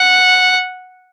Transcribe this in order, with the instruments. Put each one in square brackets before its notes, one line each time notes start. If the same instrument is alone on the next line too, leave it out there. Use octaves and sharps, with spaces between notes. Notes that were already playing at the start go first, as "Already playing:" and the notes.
Already playing: [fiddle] F#5